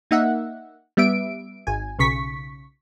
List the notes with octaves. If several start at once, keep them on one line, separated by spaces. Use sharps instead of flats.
A#3 D#4 E5 F#5
G3 B3 E5 D7
G#1 G#5
B1 C#3 C#6 B6